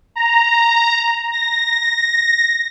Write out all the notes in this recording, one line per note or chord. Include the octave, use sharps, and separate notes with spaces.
A#5
A#6